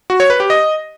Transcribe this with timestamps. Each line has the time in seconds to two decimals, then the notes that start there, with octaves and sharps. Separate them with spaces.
0.10 F#4
0.20 C#5
0.30 B4
0.40 G4
0.50 D#5